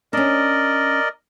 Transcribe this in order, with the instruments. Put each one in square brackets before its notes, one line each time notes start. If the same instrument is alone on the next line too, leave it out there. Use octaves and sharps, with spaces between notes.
[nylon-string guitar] C#4 D4 [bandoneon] A#4 D5 D#5